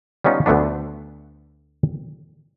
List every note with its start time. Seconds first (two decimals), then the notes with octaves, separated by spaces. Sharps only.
0.24 G3 B3 C#4 D#4 F4
0.46 D2 D3 A3 B3 D4